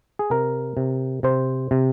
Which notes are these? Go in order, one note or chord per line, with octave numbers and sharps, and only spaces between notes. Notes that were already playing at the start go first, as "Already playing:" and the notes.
G#4
C3 A#4
C3
C3 C5
C3